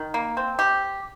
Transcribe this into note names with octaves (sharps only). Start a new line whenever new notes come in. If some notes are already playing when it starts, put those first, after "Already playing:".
Already playing: D#3
A#3
C4
G4